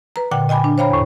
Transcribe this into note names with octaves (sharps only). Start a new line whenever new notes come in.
B4 A#5
A#2 D3 F#5 G5
D#5 G5 G#5 B5 D6
D4
C5 C#5 F5 G5 A#5 B5
E2 A2